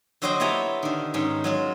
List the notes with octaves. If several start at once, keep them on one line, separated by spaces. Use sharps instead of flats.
D3 F#3 F#4 C5 D#5 G5
B3 E4 G4 C#5 G#5 A#5
D3 D#3
G#2 D#3 C#4
F#3 G#3 F4